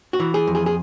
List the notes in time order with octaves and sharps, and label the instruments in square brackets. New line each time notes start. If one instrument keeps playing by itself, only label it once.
[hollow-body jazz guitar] F#4
E3
G#4
F2
G#4
G#4